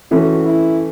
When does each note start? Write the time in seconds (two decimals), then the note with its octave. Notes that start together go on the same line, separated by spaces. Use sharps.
0.11 E3 A3 C#4 F#4
0.45 E4